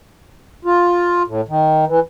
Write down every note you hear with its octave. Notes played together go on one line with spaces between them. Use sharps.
F4
A2
D#3
E3